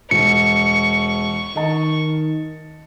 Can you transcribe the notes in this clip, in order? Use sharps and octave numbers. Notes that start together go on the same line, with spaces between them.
E1 C#6 C#7
D#3 D#5 A5